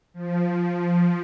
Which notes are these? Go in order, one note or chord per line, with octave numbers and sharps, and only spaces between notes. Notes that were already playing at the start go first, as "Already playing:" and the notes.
F3